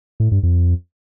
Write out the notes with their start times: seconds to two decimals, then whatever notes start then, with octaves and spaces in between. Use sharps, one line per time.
0.20 A2
0.32 G2
0.43 F2